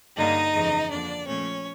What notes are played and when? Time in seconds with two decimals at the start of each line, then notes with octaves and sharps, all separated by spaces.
0.16 G2 D3 G3 A#3 D#4 D#5
0.54 F2 C#3 E3 G#3
0.91 F2 D3 F3 A#3 D4 D5
1.27 A#2 F3 A3 C#4 C#5